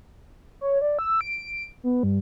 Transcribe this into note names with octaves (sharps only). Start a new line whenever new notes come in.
C#5
D5
E6
D7
B3
G2